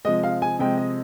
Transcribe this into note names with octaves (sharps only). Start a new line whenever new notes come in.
C3 F3 G#3 D#5
F5
G#5
C3 F3 G#3 G5
D#5